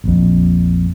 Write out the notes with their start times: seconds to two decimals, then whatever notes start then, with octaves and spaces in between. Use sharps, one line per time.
0.04 A#1 F2